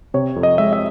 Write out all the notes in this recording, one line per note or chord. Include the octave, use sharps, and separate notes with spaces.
C3 C#5
F2
D#5
G#3 E5
E5